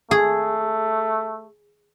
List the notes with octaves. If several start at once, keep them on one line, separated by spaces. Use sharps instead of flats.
A3 G#4